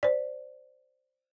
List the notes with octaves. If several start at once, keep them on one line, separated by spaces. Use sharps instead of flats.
C5 D5